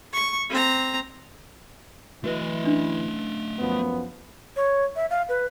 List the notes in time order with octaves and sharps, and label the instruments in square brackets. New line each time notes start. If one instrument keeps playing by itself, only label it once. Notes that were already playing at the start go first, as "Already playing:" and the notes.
[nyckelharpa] C#6
C4 A#5
[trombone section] E3 E4 [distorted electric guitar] A3 D#5 [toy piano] F#4 B4 E5
[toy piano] C#4 D4
[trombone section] F#2 F3 B3
[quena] C#5
E5
F5
B4